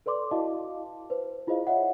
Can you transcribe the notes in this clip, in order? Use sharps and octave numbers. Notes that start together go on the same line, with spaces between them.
A4 B4 D5 C6 D6
E4 F#4 D#5 F5 A5 D6
B4 C5
E4 F4 G#4 C5 D#5 F5
F4 C#5 D#5 E5 F#5